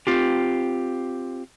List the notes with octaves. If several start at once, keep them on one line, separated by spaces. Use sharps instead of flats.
C4 F4 G4